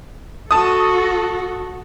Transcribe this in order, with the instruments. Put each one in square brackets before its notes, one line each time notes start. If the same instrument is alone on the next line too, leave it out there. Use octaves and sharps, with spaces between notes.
[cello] F#4 A4 [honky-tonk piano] A5 D#6